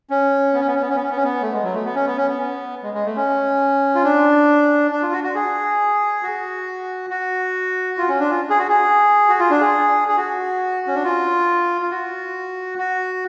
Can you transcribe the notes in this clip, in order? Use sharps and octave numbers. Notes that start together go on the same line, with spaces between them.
C#4
B3
C#4
B3
C#4
B3
C#4
B3
C#4
B3
C#4
B3
A3
G#3
F#3
A3
B3
C#4
B3
C#4
B3
G#3
G#3
A3
C#4
F4
D4
D4
F4
F#4
F#4
G#4
F#4
F#4
F4
C#4
D4
F4
G#4
F#4
G#4
F#4
F4
D4
G#4
G#4
F#4
C#4
D4
F4
F4
F#4
F#4